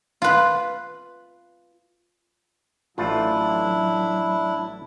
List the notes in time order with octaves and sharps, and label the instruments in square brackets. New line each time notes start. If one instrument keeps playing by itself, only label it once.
[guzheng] F4 B4
[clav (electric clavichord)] A1 A3 F4 [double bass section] F#3 [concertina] D4 E4